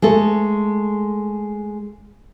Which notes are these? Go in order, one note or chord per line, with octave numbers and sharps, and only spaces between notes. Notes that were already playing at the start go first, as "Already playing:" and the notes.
G#3 A3 A4